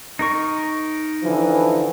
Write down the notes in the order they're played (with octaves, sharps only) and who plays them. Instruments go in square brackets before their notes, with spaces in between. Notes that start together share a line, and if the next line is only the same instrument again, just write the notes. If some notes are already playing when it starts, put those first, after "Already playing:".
[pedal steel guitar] D#4 A#4 C#6
[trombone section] D3 E3 F3